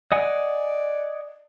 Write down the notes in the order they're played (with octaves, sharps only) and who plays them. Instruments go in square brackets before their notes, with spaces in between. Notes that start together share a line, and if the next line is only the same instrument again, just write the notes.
[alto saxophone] D5 [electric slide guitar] D#5 F#5 G#5